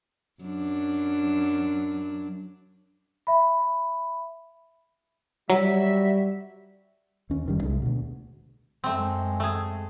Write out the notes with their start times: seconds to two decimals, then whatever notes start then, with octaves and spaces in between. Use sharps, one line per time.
0.42 F#2 D4
3.27 E5 B5
5.50 F#3 G3 F#4 E5
7.30 D#2 C#4
7.46 F#1 D#3 G3
7.63 C2 G#3
7.82 D2 B2
8.84 F#2 G#3 A3 C4
9.40 A3 G#4